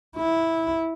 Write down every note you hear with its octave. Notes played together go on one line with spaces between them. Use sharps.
E4